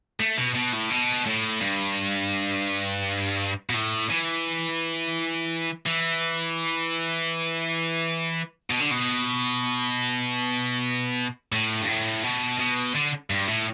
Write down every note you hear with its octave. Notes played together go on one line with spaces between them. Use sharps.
A3
B2
B2
A2
B2
A2
G2
B2
A2
E3
E3
B2
D3
B2
A2
G2
A2
B2
B2
D3
G2
A2